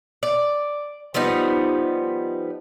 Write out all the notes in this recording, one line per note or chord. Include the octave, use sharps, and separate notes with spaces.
D5
F3 G3 B3 D#4